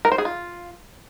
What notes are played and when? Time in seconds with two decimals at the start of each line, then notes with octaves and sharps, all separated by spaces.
0.05 A#4
0.12 C5
0.18 G#4
0.25 F4